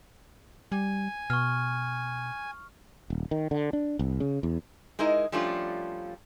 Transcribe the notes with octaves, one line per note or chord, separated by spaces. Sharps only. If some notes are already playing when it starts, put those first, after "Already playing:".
G3 G#5
B2 C#6 F6
D#1
D#3
D3
D4
C2
C#3
E2
G#3 D#4 E4 A#4 D#5
F3 G3 A3 C#4 D4 F4